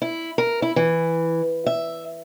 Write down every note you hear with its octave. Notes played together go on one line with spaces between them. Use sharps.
E4
A#4
E4
E3
E5